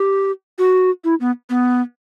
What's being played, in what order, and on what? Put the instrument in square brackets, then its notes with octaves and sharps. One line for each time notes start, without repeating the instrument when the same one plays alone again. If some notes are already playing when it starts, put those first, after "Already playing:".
Already playing: [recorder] G4
F#4
E4
B3
B3